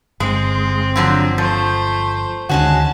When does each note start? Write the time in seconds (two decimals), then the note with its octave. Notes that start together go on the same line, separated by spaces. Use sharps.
0.20 G1 G#3 C4
0.96 D3 F3 F#3
1.38 F3 A3 C5
2.49 D2 D3 D#3 G#3 C#4 F#4 A5